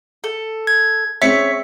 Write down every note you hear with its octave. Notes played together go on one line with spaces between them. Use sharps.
A4
G#6
G#3 C4 C#4 C#5 E5 B6 C#7